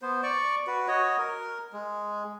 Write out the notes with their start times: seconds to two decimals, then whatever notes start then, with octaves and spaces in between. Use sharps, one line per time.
0.02 B3 C5
0.23 D5 C#6
0.67 F#4 B4
0.88 F#4 C#5 D#5
1.18 A#4
1.73 G#3